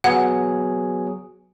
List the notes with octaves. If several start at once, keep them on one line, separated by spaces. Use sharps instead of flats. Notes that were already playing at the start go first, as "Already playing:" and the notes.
F#3 B3 G#4 F#5